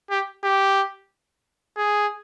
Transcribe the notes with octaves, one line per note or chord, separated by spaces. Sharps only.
G4
G4
G#4